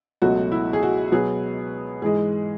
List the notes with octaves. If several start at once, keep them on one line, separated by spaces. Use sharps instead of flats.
C#2 B2 F#3 A3 F#4
E4
G#4
F#4
B2 F#3 B3 G#4
G#2 E3 G#3 G#4